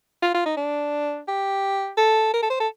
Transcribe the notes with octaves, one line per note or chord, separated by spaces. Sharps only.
F4
F4
D#4
D4
G4
A4
A#4
A4
C5
A4